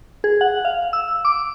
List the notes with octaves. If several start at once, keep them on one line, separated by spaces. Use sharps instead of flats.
G#4
F#5
F5
E6
D6